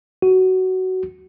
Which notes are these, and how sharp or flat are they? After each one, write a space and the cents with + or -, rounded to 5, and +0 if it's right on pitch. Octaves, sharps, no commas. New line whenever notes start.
F#4 +15